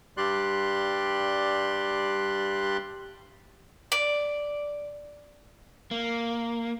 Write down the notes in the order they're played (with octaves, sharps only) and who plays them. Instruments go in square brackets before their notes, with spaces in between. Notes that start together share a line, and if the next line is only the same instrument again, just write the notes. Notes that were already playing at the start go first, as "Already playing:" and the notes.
[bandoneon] G2 G3 G4 D5 C6 F#6
[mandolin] D5
[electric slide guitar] A#3